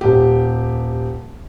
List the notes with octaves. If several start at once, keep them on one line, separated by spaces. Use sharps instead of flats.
D#1 G4